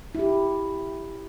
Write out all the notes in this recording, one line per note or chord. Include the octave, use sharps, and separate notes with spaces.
E4 G4